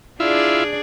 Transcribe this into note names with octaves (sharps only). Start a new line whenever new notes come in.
D4 E4 F4 G#4 D5